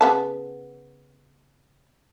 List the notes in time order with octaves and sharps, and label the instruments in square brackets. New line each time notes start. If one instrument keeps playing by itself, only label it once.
[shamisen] C#3 B3 A5